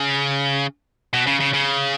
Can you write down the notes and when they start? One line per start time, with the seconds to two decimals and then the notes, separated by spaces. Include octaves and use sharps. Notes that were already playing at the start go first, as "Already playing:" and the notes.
Already playing: C#3
1.14 B2
1.27 C#3
1.40 C#3
1.53 C#3